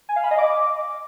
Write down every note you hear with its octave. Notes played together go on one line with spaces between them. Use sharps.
G#5
F5
B5
D#5
D6